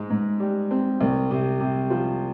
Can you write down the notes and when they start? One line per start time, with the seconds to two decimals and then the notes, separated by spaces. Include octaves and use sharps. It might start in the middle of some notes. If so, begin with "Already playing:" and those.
Already playing: G#2 G#3
0.10 G#2
0.40 G3
0.71 C4
1.01 C2
1.31 C3
1.60 C3
1.90 F3